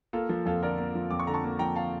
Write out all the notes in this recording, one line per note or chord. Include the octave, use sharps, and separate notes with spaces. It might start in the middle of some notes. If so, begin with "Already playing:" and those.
A#3 F4 A4
F3 F4
F2 F4 A4
D3 A#4 D5
A#3
F3
F2 D6
C#6
D3 A#5
A5 C#6
A#3
F3 G5 A#5
F5 A5